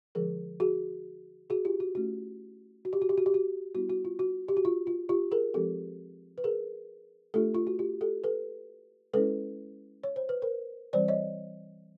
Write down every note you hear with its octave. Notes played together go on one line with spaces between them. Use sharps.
D3 F3 G#3 G#4 A#4
F#4 G#4
F#4 G#4
F4 G4
F#4
A3 C#4 E4 F#4
F#4
G4
F#4
G4
F#4
G4
F#4
G3 B3 E4 F#4
F#4
F4
F#4
G4
F#4
F4
F4
F4 G4
G#4 A#4
F3 G#3 C4 G4 A4
B4
G#4 A#4
A3 D4 F4 G4 A4
F4
F#4
F4 G4
G4 A4
A4 B4
G#3 C#4 E4 A4 B4
C#5
C5
B4
A#4 C5
E3 G3 C4 C5 D5
C#5 D#5